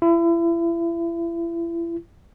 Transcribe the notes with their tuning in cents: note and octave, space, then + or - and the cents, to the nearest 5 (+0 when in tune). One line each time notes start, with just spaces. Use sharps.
E4 +35